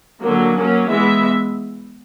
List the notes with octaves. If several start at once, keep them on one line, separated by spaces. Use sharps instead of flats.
D3 F#3 A#3
F#3 A#3 C#4
E3 G#3 B3 E5